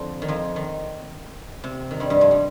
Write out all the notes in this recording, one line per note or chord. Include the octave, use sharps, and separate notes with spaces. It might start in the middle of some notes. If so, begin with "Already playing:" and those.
Already playing: F2 D3 F3
D#3
F2 F3
D#3
C3
D#3
G2 G3
G2 G3
F2 F3
G3